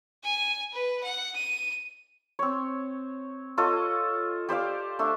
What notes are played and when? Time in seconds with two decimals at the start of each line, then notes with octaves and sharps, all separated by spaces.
0.24 G#5
0.73 B4
1.04 F#5
1.36 D#7
2.39 C4 C#5
3.57 F4 A4 C#5 D#5
4.49 G4 C5 D5 F5
4.99 A3 D4